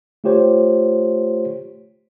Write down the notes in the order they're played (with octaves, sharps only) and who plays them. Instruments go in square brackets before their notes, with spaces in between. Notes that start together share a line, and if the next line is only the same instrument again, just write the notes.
[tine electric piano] A3 F4 G4 C5 C#5